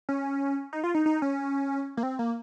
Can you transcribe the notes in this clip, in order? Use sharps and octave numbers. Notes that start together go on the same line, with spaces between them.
C#4
D#4
F4
D#4
D#4
C#4
A#3
C4
A#3